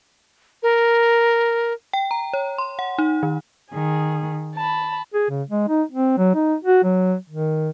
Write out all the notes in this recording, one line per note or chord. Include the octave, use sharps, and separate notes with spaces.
A#4
G5
A#5
C#5
C6
F#5
D#4
D#3
D#3 G#4
A5 B5
G#4
C#3
G#3
D#4
C4
F#3
D#4
F#4
F#3
D#3